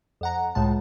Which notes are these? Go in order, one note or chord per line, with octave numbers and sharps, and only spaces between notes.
F2 F#5 A#5
C#2 A2 G#3 A5